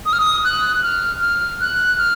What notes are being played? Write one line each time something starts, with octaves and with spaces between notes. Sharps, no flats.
D#6
F6
D#6
F#6
F6
F6
F#6
F6